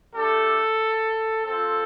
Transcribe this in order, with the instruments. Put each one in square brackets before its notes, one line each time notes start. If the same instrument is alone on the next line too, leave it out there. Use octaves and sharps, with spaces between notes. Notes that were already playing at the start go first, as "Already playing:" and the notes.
[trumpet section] A3 D4 G4 A4
C4 F4 A4